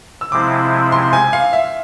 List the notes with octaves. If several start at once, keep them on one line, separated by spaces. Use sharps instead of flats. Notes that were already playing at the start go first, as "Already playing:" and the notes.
E6
C3 F3 G#3 C4 E4 D6
C6
G#5
F5
E5